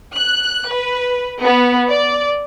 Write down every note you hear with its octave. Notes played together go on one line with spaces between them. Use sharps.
F#6
B4
B3
D5